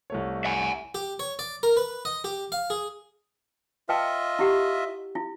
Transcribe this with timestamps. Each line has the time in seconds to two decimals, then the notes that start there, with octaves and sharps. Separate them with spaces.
0.10 C2 A3 C#5
0.45 E5 F#5 G#5
0.95 G4
1.19 C#5
1.39 D5
1.63 A#4
1.77 B4
2.05 D#5
2.24 G4
2.52 F5
2.70 G#4
3.89 F4 B4 D#5 E5 G5 A5
4.39 E4 G4 F#5
5.15 E4 F4